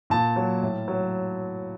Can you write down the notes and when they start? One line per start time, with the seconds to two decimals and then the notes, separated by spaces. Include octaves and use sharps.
0.10 A#2 A5
0.36 F#3
0.62 A2
0.88 F#3